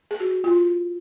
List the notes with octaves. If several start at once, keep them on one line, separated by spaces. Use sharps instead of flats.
G#4
F#4
F4